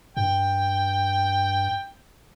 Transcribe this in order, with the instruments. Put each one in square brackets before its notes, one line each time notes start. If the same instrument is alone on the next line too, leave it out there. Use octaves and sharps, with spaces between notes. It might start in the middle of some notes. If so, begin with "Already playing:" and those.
[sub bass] G2 [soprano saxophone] G5